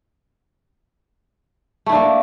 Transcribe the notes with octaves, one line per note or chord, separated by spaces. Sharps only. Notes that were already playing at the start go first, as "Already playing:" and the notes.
A3 A#3 D4 E4